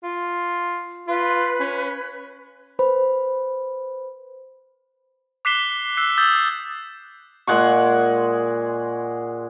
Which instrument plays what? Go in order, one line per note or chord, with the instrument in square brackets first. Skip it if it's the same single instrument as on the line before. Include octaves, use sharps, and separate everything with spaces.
[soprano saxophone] F4
[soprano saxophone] F4 [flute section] B4
[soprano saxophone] C#4
[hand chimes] B4 C5 B5
[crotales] D6 F#6 B6 C7 E7 G7
E6 F#6 C7
D#6 E6 F#6 G6 A6
[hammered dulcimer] A#2 G#3 F#5 C#6